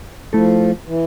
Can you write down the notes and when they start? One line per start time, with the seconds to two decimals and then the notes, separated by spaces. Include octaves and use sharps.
0.33 F3 A3 E4 A4
0.87 E3